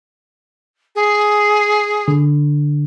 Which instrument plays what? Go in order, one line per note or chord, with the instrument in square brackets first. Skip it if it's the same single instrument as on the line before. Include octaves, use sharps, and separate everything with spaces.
[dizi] G#4
[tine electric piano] D3